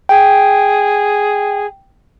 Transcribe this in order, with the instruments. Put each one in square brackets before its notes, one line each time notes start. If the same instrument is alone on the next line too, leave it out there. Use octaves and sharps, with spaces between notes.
[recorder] G#4 [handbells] G5